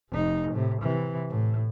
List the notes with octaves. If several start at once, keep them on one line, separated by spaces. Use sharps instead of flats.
F1 D#4
A2 C3
C3 E3
A2